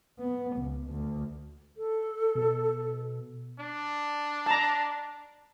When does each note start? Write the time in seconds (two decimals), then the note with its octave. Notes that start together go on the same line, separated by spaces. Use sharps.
0.19 B3
0.56 C#2
0.90 D2
1.77 A4
2.35 B2
3.58 D4
4.46 A5 A#5